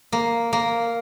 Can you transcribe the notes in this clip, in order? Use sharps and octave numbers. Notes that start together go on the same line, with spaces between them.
A#3
A#3